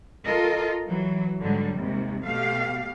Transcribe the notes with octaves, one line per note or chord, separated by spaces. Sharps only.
F4 A4 A#4 D#5
E3 F#3
G#2 D3 F#3 G3
D#2 G#2 C3
B2 A3 G4 F5